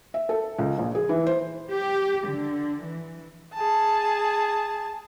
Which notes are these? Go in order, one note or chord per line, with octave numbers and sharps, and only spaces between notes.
E5
A4
C#2
A#1
G#4
E3
C5
G4
D3
E3
G#4 A5